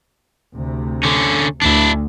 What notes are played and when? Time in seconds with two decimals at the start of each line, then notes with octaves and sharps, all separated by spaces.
0.55 D2 C3
1.03 D3 C#4
1.62 D2 D4 E4